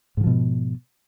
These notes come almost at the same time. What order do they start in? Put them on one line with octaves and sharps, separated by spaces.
G#2 D3 F3 B2